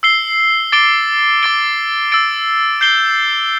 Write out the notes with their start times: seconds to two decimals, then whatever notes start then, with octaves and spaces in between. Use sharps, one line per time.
0.03 E6 C7 G7
0.72 D6 A6 D7 G7
1.43 D6 A6 D7 G7
2.12 E6 A6 D7
2.81 G6 C7 G7